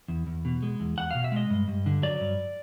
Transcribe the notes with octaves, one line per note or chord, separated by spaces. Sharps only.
E2
E2
B2
G#3
E2
E2 F#5
B2 F5
E5
G#3 D#5
G2
G2
D3
F#3 D5
G2